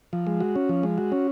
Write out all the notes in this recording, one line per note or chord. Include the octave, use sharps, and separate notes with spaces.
F3
G#3
F#4
C#4
F3
G#3
F#4
C#4